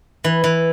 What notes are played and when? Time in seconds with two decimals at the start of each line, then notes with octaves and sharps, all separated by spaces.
0.24 E3
0.44 E3